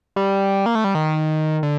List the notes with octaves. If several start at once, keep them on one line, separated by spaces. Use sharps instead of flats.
G3
A#3
A3
G3
D#3
D3